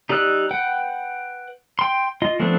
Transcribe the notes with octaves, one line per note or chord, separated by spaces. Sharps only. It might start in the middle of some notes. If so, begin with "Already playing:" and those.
D#4 G4 D5 E6 F#6
B4 F#5 G5
G5 C6
F4 D#5
F3 A3 B3 C4 D4